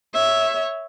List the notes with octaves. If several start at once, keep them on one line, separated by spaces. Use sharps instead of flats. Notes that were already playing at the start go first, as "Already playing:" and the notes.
C#5 E5